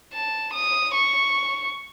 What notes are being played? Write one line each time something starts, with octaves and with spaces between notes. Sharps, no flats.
A5
D#6
C#6